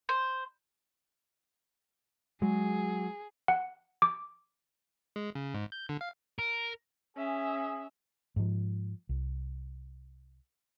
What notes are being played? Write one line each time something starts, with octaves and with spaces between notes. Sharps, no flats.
C5
F#3 G#3 G#4
F#5
D6
G#3
C#3
G#2
G6
D3
F5
A#4
C#4 G#4 E5
G#2 F3
C2